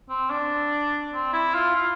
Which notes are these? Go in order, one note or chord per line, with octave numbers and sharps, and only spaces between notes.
C4
D4
C4
E4
F4
F4